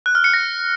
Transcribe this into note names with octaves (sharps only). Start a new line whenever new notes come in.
F#6
F6
C#7
A#6